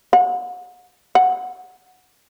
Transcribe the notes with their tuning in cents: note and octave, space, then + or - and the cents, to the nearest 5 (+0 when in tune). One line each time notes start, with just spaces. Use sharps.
F#5 -40
F#5 -15